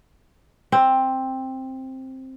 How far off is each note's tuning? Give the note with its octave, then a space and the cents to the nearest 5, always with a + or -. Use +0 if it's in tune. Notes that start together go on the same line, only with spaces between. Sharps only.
C4 +10